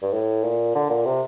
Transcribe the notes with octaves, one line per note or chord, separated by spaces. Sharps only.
G2
A2
A#2
D3
A#2
C3